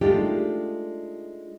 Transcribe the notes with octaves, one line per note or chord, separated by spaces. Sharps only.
G#3 A3 D4 D#4 F4 G4